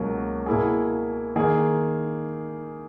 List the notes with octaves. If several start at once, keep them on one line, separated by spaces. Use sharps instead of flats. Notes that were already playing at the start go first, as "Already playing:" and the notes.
Already playing: C#2 B2 F#3 A#3
B2 A#3 E4 G#4
D#3 A#3 D#4 G#4